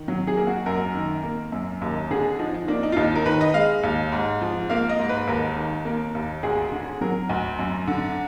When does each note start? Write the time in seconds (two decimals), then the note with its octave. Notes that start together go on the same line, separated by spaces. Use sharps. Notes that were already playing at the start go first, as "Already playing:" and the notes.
Already playing: D#3
0.08 F#3
0.27 G#4
0.37 A#3
0.47 F#4
0.66 F#2 A#4
0.95 D#3
1.23 A#3
1.52 F#2
1.81 D#2 A#4
2.10 D3 G#4
2.39 F3 D#4
2.54 D#4
2.68 A#3 D4
2.83 D#4
2.92 F4
2.96 D#2 D#4
3.16 A#4
3.25 D#3 B4
3.41 D#5
3.54 G#3 F5
3.83 D#2
4.12 G#2
4.41 F3
4.70 A#3 F5
4.89 D#5
4.99 G#2
5.09 B4
5.27 D#2 A#4
5.56 D#3
5.85 A#3
6.15 D#2
6.43 D2 G#4
6.72 D3
7.01 F#3 A#4
7.29 D2
7.59 F#2
7.87 D3